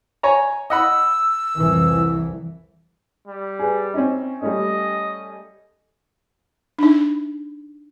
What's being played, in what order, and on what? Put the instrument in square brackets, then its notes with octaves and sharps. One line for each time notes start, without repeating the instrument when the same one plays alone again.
[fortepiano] C#5 G#5 A#5
[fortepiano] D#5 F#5 B5 [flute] E6
[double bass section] C2 F2 E3
[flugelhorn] G3
[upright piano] G#4 B4
C4 C#4 D#4
[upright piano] G3 A3 C#4 [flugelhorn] D#5
[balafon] D4 D#4